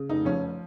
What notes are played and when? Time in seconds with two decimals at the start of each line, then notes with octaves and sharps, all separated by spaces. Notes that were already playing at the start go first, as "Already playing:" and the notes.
Already playing: C#3
0.09 F1 D#4
0.25 F3 C#4